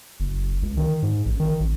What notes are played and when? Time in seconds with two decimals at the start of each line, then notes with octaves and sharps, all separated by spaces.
0.20 F#1
0.62 C#2
0.77 D#3
1.02 G#2
1.26 A1
1.40 D#3
1.60 A1